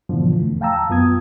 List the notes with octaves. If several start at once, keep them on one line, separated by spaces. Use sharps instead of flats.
G#2 B2 D3 E3 F3
E2 A3
F5 G5 A5 A#5 E6
F#2 B3 F4 D#6 G#6